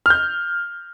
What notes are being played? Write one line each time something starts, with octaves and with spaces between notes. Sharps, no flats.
F6
G6